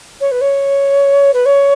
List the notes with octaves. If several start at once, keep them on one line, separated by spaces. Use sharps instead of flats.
C#5
B4
C#5
B4
C#5